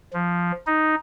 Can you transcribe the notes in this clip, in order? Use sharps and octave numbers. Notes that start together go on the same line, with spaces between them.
F3
D#4